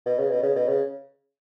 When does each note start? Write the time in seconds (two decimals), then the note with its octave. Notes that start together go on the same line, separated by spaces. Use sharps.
0.06 B2
0.19 C#3
0.31 B2
0.43 C#3
0.56 B2
0.69 C#3